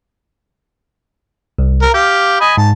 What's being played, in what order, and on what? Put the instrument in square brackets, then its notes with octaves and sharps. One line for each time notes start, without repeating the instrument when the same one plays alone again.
[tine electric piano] C2
[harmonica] A#4
[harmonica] G4 F5 [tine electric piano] G6
[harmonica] D#5 G#5 B5
[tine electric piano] G#2 [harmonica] A5